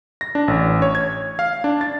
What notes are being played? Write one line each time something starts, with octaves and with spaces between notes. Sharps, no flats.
A#6
D4
A1
C#5
G#6
F5
D4
A6